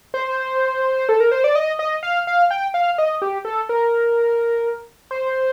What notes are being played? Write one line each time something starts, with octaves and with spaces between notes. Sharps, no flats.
C5
A4
A#4
C5
D5
D#5
D#5
F5
F5
G5
F5
D#5
G4
A4
A#4
C5